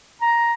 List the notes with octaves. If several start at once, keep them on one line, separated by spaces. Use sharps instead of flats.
A#5